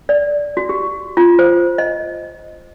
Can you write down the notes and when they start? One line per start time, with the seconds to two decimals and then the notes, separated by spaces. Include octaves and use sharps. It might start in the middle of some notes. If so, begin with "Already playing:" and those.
0.09 D5
0.57 F#4
0.69 G4
1.17 F4
1.39 C5
1.78 D#5